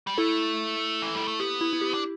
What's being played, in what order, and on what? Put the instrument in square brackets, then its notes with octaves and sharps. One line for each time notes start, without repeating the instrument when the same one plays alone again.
[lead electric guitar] G3
[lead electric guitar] A3 [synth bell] E4 A4
[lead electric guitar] E3
G3
A3
[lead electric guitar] B3 [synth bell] G4
[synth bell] E4
E4
G4
[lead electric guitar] D4